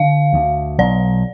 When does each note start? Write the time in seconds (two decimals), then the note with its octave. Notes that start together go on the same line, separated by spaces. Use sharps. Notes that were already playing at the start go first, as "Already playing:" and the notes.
Already playing: D3 F5
0.33 D2
0.78 B1 D5